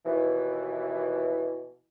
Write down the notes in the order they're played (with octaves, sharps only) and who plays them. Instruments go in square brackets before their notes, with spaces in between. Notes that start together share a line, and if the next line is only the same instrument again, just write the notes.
[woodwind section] D#2 B2 E3